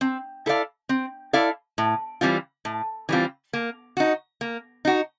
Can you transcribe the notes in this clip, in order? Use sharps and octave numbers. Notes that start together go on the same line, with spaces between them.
C4
E4 A4 D5 F5
C4
E4 A4 D5 F5
A2
E3 G3 C4 F4
A2
E3 G3 C4 F4
A#3
D#4 F#4
A#3
D#4 F#4